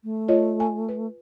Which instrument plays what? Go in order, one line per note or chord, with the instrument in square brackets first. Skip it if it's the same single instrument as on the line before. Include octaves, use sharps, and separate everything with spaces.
[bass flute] A3
[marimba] F4 C#5 D#5
G#5
B4